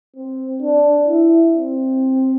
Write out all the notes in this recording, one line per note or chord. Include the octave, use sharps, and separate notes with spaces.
C4
D4
E4
C4